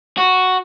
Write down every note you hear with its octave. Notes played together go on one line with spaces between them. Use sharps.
F#4